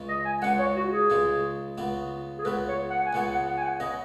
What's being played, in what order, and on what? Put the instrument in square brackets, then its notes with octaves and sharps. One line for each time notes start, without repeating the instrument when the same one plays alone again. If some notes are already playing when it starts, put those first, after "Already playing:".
Already playing: [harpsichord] C#2 C#3 G#3
[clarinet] D#5
G#5
[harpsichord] C#2 C#3 G#3 [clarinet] F#5
[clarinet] C#5
F#4
G#4
[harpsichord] C#2 C#3 G#3
C#2 C#3 B3
[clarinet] G#4
[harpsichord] C#2 C#3 B3 [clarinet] B4
[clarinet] C#5
F#5
G#5
[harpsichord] C#2 C#3 B3 [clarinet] F#5
[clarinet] F#5
F#5
G#5
F#5
[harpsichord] C#3 B3 [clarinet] D#5